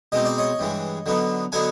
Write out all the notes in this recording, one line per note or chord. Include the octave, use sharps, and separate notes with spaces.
B2 G#3 C4 D#4 D#5
D5
C#5 D#5
G2 E3 G#3
D3 F#3 B3 D#4
D3 F#3 B3 D#4 F#5 G#5